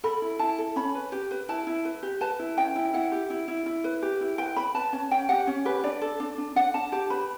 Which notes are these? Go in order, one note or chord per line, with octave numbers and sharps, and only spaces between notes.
A4 B5
E4
E4 A5
A4
C#4 B5
B4
G4
B4
E4 A5
E4
B4
G4
B4 A5
E4
C#4 G5
E4
E4 F#5
G4
E4
E4
E4
B4
G4
E4
B4 G5
B4 B5
B4 A5
C#4 A5
C#4 G5
G4 F#5
C#4
G4 B4
D4 D5
A4
D4
D4
D4 F#5
D4 A5
G4 A5
B4 B5